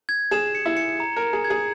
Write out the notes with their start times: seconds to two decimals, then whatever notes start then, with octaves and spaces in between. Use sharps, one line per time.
0.09 G#6
0.31 G#4 E7
0.55 C#7
0.66 E4
0.77 C#7
1.00 A#5
1.16 A#4
1.22 A#5
1.33 G#4
1.44 G#6
1.50 G#4